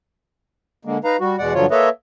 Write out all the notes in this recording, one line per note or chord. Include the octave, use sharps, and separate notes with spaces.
D3 G#3 A#3
D#4 B4 F5 A#5
G3 F#4
E2 B2 G#3 D5 F#5
G2 D3 F3 F#3 F4 C#5
A#3 A4 B4 C#5 D#5 E5